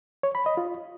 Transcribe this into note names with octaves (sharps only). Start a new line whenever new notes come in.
C#5
B5
D#5
F4